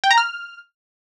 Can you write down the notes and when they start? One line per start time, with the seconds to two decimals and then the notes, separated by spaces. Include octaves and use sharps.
0.04 G5
0.11 A#5
0.18 F6